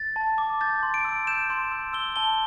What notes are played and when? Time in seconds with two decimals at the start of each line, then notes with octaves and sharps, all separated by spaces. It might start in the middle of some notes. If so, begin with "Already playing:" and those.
Already playing: A6
0.16 A5
0.38 D6
0.61 G6 A6
0.83 C6
0.94 D7
1.05 E6
1.27 G6 E7
1.50 C6
1.71 E6
1.93 E6 G7
2.16 A5 G7